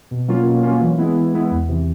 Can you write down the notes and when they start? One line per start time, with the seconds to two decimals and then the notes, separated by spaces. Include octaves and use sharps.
0.11 B2
0.28 F#3 A#3 C#4 F4
0.46 B2
0.63 F#3 A#3 C#4 F4
0.81 E3
0.98 G#3 B3 E4
1.16 E3
1.33 G#3 B3 E4
1.51 E2
1.68 C3 E3